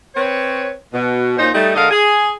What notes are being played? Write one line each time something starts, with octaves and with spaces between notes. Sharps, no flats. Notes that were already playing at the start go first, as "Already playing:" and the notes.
C4 B4 C#5
B2
A#2 C#4 D#4 C5
G3 A3 D#4
D3 G#3 A#4 D#5 F5
G#4